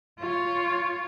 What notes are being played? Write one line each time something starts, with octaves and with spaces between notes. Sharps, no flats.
F4 C#5